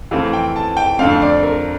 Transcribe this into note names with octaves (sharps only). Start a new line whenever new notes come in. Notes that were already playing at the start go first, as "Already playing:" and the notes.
F2 E3 A3 C4 F5
G5
A5
G5
F2 D3 A3 C4 F5
D5
A#4